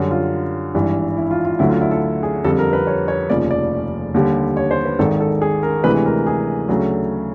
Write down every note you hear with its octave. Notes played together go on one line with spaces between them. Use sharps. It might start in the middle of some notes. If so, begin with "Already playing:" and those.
Already playing: F#2 D3 G3
F4
G#1 G2 E3
E4
F4
F4
D2 D3 F#3 A3 E4
F4
E4
A4
G#4
F2 D3 G3 A4
A#4
B4
C#5
C#5
F1 D#2 C#3 F3 D5
D5
D#2 D3 G3
C#5
C5
B4
G#1 G#2 D#3 A4
A4
G#4
A#4
D2 C3 E3 G#3 B4
A#4
G#4
D2 C#3 F#3 A3